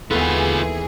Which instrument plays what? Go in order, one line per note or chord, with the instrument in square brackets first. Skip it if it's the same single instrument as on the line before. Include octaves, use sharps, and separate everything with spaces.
[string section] D#2 E3 G#4 [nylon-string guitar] B3 F#4 A4 [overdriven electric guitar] F4 B4